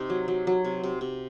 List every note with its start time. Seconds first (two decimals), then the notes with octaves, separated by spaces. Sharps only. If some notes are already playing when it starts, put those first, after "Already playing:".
Already playing: C3 D#4
0.10 F#3
0.28 F#3
0.47 F#3
0.65 C3
0.83 C3
1.01 C3